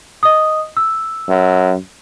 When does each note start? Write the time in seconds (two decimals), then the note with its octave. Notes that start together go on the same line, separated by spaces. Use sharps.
0.23 D#5 D#6
0.77 E6
1.29 F#2